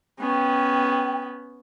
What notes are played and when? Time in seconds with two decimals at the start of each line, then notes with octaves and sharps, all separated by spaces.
0.20 B3 C#4 G5